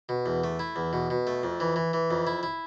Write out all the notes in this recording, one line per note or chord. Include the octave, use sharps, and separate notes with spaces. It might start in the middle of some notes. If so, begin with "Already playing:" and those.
B2
E2
A3
E4
E2
B2
B2
A3
F2
E3
E3
E3
F2
E4
E4